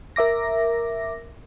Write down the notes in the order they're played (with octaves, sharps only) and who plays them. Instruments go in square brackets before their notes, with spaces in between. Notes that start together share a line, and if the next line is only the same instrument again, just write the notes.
[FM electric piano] A#4 E5 D6 A#6